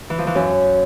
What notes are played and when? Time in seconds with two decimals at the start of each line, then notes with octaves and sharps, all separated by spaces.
0.10 E3
0.18 F3
0.27 E3
0.35 F#2